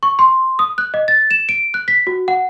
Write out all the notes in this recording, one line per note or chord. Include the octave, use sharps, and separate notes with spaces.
C#6
C6
D#6
F#6
D#5
A6
E7
D7
F#6
B6
F#4
F#5